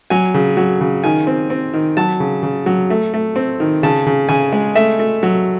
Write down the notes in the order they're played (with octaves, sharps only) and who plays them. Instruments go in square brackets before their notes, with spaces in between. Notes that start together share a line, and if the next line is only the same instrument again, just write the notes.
[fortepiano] F#3 G#5
C#3
F#3
C#3
D#3 G#5
C4
C4
D#3
F#3 A5
C#3
C#3
F#3
A3
A3
C4
D#3
C#3 A5
C#3
C#3 G#5
G#3
A3 E5
A3
F#3